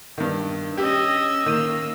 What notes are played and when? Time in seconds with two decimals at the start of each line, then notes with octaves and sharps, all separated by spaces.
0.18 G2 D#3
0.78 C#4 G4 D#5 E6
1.46 D#3 A#3 D#7